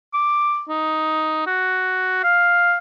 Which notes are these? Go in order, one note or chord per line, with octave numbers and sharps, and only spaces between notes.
D6
D#4
F#4
F5